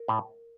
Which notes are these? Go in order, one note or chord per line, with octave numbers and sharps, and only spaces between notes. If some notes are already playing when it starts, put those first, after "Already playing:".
Already playing: A#4
A2